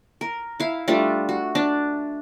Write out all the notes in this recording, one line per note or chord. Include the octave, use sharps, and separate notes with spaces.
A#4
E4 F5
G3 A3 D4 F4
F#4
D4